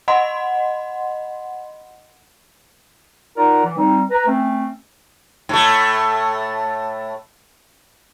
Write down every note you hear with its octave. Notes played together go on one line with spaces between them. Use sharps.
D#5 F#5 B5 C6
D#4 F4 A#4 D5 F#5 A#5
E3
G3 C4 D#4
B4 A#5
A3 C4 C#4
A2 A3